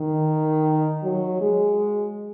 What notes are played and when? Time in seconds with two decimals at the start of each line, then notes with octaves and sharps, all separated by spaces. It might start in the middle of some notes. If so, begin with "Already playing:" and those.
Already playing: D#3
1.03 F#3
1.41 G#3